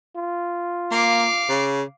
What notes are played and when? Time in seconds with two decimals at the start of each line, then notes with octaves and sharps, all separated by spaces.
0.16 F4
0.92 A#3 F5 D6
1.49 C#3